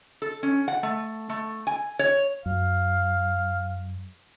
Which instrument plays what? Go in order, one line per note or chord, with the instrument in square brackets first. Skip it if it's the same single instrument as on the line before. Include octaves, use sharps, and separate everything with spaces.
[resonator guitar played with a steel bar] A4
C#4
F#5
A3
A3
G#5
C#5
[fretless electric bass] F#2 [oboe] F5